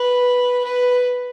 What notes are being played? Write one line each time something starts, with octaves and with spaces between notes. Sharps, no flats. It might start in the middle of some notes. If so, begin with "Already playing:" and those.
Already playing: B4
B4